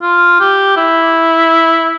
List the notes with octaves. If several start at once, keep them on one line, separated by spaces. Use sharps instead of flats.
F4
G4
E4